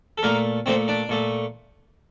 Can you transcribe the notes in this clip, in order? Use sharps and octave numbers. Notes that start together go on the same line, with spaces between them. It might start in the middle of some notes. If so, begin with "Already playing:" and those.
A4
A#2 A3 A#3 A#4
A#2 A3 C4 C5
D4 D5
A#2 A3